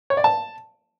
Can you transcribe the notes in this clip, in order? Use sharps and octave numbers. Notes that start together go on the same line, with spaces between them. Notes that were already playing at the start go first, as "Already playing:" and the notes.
C#5
D5
A5